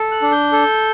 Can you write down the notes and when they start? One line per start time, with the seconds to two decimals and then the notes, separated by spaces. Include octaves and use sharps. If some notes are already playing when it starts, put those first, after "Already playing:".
Already playing: A4
0.12 F#6
0.22 D4
0.32 G6
0.52 A4